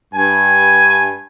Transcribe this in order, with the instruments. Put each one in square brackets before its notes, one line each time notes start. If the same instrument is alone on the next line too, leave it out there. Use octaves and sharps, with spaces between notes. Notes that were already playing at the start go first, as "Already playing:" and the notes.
[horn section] G2 G#5